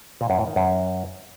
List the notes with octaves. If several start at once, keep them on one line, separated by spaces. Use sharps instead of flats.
A#2
F#2
A2
D#3
F#2